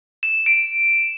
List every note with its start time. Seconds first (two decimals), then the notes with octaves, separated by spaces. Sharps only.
0.23 E7
0.46 D7